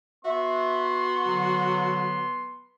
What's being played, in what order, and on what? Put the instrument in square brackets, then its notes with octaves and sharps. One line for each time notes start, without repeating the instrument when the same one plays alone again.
[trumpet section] B3 C6 [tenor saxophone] F#4 [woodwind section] E5
[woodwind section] D3 F#3